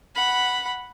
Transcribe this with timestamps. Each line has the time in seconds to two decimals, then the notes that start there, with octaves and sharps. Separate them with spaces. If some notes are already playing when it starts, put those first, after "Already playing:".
0.15 F#5 B5